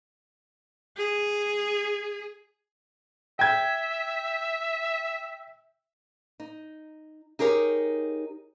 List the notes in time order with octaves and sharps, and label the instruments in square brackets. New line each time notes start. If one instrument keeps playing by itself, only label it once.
[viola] G#4
[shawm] E5 [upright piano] G5 G#6
[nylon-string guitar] D#4
D#4 G4 G#4 A#4 C#5